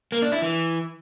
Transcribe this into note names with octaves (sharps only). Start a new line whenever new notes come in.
A#3
D4
E4
E3